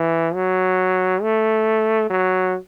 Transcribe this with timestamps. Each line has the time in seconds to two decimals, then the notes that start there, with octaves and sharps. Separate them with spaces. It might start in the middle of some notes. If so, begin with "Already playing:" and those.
Already playing: E3
0.35 F#3
1.22 A3
2.10 F#3